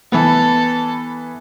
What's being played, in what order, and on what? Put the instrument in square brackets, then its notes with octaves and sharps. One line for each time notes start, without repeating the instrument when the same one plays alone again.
[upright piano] E3 B3 [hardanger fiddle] A4